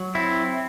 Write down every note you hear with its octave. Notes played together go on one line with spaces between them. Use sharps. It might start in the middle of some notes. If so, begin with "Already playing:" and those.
Already playing: F#3
C4 E4